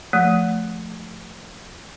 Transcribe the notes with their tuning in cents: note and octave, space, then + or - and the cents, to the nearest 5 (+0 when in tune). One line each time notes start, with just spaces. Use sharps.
F3 +0 A3 +0